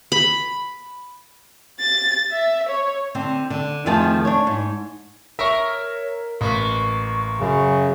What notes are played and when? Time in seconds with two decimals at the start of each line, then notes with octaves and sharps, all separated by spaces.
0.12 B5
1.80 A6
2.31 E5
2.69 C#5
3.15 D3 C4
3.50 D3
3.86 F2 D#3 F3 A3 G#4 A5
4.25 D4 C#5
4.47 G#2
5.39 A#4 C#5 E5 C#6
6.41 A1 A#3 B4 C#6
7.40 F#2 C#3